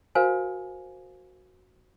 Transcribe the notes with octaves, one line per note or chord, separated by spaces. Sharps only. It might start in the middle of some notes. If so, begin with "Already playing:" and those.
F#4 A#4 C5 F5 G#5